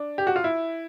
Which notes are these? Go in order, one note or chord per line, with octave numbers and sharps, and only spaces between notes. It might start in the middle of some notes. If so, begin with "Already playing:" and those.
Already playing: D4
G4
F#4
F4
E4